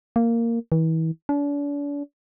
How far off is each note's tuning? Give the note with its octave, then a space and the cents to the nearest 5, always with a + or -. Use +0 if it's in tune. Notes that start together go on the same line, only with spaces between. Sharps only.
A#3 -10
E3 -35
D4 -40